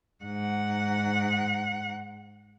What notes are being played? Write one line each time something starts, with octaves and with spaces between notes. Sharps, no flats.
G#2 F#5